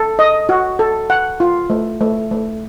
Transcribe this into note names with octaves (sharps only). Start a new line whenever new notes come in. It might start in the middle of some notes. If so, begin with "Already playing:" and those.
Already playing: A4
D#5
F#4
A4
F#5
F4
A3
A3
A3